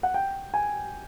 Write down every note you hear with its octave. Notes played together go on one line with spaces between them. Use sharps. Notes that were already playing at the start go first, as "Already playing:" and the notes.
F#5
G5
G#5